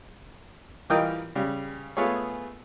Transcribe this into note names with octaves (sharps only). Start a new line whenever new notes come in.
E3 G3 F4 A#4 D#5 G5
C#3 G3
A3 B3 F4 G#4 C#5